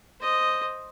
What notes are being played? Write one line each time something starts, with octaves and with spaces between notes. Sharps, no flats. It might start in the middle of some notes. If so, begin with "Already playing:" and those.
C5 D#5